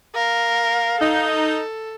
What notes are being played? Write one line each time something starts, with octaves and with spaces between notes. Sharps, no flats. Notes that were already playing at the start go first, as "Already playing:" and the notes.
A#4 F5
D#4 A4